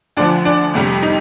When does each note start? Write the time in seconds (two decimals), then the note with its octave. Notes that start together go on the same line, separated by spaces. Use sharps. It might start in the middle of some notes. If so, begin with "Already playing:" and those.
0.17 D2 D3 F3 D4
0.45 D4
0.74 G1 F2 C3 G3
1.02 D#4